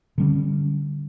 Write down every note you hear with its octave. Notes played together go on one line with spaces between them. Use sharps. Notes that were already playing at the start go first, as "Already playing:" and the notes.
D3 G3 C#4